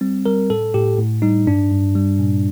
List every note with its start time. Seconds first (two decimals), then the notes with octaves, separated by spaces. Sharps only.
0.01 G3 C4
0.26 G3 A#4
0.50 A2 A4
0.74 A2 G4
0.98 A2
1.22 G3 D#4
1.47 G2 D4
1.71 G2
1.95 G3
2.19 A#2